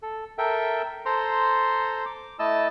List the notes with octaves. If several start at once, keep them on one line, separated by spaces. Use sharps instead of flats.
A4
A4 A#4 E5 G5
A4 C5 A#5 C6
D6
A3 E4 D#5 A5 E6